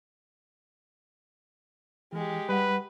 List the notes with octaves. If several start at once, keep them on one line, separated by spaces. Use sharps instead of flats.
E3 G#3 G4
G3 B4 F#5